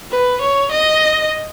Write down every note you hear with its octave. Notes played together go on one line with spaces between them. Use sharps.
B4
C#5
D#5